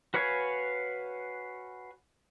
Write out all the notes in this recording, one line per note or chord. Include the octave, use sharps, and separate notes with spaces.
F#4 B4 C#5 F5 G#5